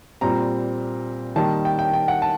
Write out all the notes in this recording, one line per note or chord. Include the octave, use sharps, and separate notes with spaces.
A#2 G3 C4 A#5
D#3 G3 A#3 A5
G5
G5
G5
F#5
A5